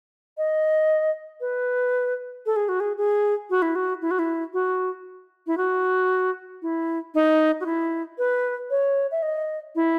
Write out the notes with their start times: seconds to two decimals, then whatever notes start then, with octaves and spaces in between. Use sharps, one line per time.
0.38 D#5
1.41 B4
2.46 A4
2.56 G#4
2.69 F#4
2.80 G#4
2.98 G#4
3.50 F#4
3.62 E4
3.75 F#4
4.02 E4
4.11 F#4
4.19 E4
4.53 F#4
5.47 E4
5.57 F#4
6.62 E4
7.15 D#4
7.60 F#4
7.66 E4
8.18 B4
8.71 C#5
9.11 E5
9.22 D#5
9.75 E4